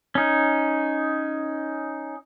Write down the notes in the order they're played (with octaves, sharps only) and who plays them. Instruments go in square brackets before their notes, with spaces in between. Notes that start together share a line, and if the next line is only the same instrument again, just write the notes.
[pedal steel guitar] C#4 D#4